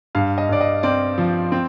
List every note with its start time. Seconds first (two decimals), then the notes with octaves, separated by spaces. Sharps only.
0.15 G2 F5
0.38 D#5
0.49 G2 D5
0.61 D#5
0.83 C4 D5
1.18 F3
1.52 C4